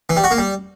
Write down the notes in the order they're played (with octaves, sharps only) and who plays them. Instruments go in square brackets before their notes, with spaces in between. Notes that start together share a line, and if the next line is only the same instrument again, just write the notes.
[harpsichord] E3
G3
F#4
A#3
G3